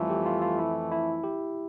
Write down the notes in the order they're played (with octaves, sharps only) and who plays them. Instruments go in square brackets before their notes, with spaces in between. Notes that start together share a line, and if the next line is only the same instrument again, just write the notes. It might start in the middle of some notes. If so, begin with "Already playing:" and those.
Already playing: [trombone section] F2 E3 A3 [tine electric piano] G3 F4
[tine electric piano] G4
F4
F4
E4
E4
G4